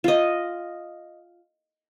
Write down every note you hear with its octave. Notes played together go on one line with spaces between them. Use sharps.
F4 D#5